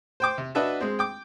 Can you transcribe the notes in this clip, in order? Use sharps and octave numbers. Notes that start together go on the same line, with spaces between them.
C5 G5 D6
C3
D4 F#4 B4 D#5 E5 A5
G#3 C4
G5 D6